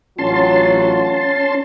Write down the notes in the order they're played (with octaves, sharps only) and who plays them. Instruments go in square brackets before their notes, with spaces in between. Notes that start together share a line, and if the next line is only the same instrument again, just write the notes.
[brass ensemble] A1 F#3 [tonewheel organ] C#4 A5 C6 [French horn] F4